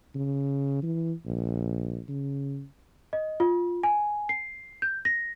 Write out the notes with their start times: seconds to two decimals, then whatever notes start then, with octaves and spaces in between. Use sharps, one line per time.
0.15 C#3
0.83 E3
1.25 A#1
2.08 C#3
3.13 D#5
3.40 F4
3.83 G#5
4.29 C7
4.82 G6
5.05 A#6